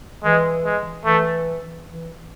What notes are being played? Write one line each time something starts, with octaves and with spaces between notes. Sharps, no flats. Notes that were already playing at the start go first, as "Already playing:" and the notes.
E3 G#3
G#3
E3 A3
E3